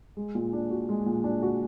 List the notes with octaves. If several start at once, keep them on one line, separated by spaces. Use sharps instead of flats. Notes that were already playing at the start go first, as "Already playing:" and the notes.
G#3
A#2
D4
F#4
G#3
A#2
D4
F#4